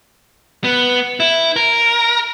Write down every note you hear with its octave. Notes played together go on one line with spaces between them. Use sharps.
B3
E4
A#4